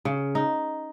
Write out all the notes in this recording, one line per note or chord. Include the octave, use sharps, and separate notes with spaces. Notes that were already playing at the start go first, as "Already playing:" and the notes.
C#3
D#4